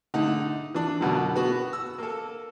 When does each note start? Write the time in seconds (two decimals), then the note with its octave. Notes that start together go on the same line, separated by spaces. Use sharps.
0.14 D3 A3 D#4
0.75 E3 D4
1.01 F#2 B2 D3 F#3
1.36 B3 F#4
1.73 E6
1.98 A#3 A4